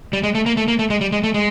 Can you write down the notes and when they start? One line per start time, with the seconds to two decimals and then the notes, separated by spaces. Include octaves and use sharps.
0.13 G3
0.23 G#3
0.35 A3
0.46 A#3
0.57 A3
0.68 A#3
0.79 A3
0.90 G#3
1.01 G3
1.12 G#3
1.24 A3
1.34 G#3